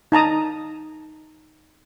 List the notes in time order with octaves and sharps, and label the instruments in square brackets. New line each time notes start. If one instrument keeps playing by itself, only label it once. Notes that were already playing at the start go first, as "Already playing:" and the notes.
[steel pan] D#4 A5 A#5 D#6